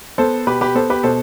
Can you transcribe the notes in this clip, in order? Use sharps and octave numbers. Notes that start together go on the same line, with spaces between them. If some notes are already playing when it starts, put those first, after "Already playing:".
B3 A4 C5
B2 G4 B4
G4 B4
B3 A4 C5
G4 B4
B2 A4 C5